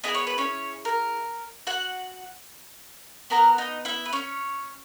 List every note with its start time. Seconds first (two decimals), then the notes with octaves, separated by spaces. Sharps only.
0.04 B3 E4 G#4 D#5
0.15 C#5
0.27 B4
0.38 C#4 C#5
0.85 A#4
1.67 F#4 F#5
3.30 B3 F#4 A#4 A#5
3.58 D#4 D#5
3.85 E4 E5
4.05 B4
4.13 C#4 C#5